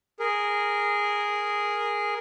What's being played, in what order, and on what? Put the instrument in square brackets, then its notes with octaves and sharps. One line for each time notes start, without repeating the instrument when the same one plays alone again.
[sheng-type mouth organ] G#4 A#4